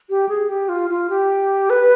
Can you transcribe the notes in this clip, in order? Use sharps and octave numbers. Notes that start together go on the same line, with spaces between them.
G4
G#4
G4
F4
F4
G4
B4